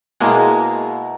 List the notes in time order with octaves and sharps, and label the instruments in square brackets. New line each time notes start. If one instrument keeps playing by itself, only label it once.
[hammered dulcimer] B2 E4 A#5 [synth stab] G#3 A#3